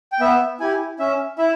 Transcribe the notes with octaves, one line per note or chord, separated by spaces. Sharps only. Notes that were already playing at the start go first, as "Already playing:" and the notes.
G5
B3 E5
E4 G4 G#5
C#4 E5
E4 E5